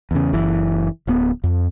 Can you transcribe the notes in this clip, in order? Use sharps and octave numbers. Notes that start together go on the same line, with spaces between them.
E2 C#3
F#1 E3
D1 B3
F2